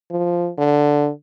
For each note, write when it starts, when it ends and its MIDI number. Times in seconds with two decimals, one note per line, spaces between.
0.11 0.49 53
0.58 1.09 50